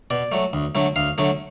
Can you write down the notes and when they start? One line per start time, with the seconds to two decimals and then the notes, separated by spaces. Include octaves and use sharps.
0.10 B2 D5
0.32 F#3 A3
0.53 D2
0.75 D3 F#3 A3
0.96 D2 F5
1.18 D3 F#3 A3